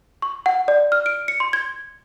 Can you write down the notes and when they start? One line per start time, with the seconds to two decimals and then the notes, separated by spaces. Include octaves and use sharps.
0.22 C#6
0.46 F#5
0.68 D5
0.92 F6
1.06 D7
1.28 C#7
1.40 C6
1.53 G#6